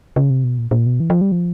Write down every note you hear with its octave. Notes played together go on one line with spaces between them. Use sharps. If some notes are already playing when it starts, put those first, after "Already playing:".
C#3
C3
B2
A#2
A#2
B2
E3
F3
G3
F3